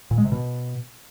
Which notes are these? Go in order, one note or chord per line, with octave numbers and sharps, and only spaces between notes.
A#2
G#3
C3
B2